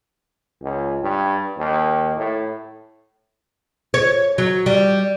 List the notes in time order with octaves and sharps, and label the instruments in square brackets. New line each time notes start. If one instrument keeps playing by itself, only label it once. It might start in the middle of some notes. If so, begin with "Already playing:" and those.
[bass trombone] C#2
G2
D#2
A2
[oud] C#5
F#3
G3